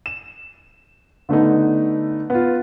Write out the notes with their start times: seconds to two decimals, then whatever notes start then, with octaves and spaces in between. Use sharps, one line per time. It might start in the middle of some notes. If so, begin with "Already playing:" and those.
0.06 E7
1.29 D3 A3 B3 D#4
2.30 B3 F4